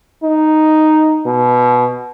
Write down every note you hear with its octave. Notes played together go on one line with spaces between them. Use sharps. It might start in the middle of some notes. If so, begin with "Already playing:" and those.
D#4
B2